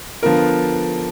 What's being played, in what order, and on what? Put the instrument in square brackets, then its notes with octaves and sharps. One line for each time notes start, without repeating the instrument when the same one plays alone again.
[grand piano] D3 F3 B3 F4 A#4